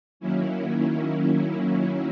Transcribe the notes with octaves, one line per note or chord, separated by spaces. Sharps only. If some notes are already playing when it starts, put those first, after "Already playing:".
D#3 F#3 A#3 C#4 E4